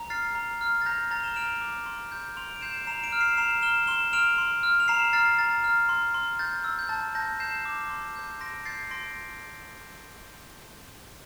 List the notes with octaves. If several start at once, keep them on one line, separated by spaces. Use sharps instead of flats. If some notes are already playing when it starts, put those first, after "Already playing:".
Already playing: A#5
F6 A6 C7
A#5
F6
A6
A#5 G6 A#6
A#5 A6
E7 G7
F6 D7 F7
D6
C6
G6
C6 D7 F7
D7
G6 C7 E7
A#5 C7 E7
D7 F7
F6
C7 E7
A#5 C7 E7
F6 E7 G7
C6 E7 G7
F6 D7 F7
C6
F6
F7
A#5 C7 E7
F6 A6 C7
A#5 A6
F6
C6
C6
G6 A6
E6
G6
A5 A6
A5 G6 A#6
G6 C7 E7
D6
C6
G6
C7
C6 A#6 D7
G6 A6 C7
C6 A#6 D7